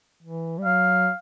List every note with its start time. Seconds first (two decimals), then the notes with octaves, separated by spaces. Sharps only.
0.23 E3
0.58 G3
0.65 F#3 F5